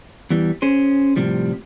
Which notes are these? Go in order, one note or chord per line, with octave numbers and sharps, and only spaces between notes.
E2 E3 G3
C#4 G#4 C5
A2 C3 F3 G3